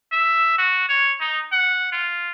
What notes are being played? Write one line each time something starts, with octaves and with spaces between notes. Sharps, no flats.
E5
F#4
C#5
D#4
F#5
F4